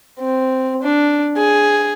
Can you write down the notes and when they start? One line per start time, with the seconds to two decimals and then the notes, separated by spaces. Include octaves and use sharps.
0.19 C4
0.82 D4
1.37 G#4